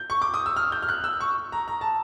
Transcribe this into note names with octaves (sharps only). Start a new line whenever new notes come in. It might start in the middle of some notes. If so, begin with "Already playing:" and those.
Already playing: G6
C#6
D6
D#6
E6
F6
G6
F6
F#6
E6
C#6
A#5
A#5
A5